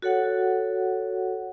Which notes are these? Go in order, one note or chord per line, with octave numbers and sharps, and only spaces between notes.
F#4 A4 C#5 F#5